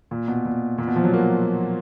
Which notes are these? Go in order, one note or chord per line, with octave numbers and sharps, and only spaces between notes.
A#2
B2
A#2
A#2
B2
F3
F#3
A#3